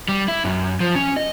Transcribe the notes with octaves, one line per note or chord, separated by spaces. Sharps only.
G3
E4
F#2
F3
C#4
D#5